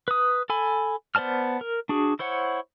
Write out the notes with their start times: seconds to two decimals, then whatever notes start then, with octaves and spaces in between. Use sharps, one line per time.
0.08 B4 D#6
0.50 A4 G#5 B5
1.15 B3 C5 D5 A5 F6
1.61 A#4
1.89 D4 F#4 G#4
2.19 E4 C5 C#5 F#5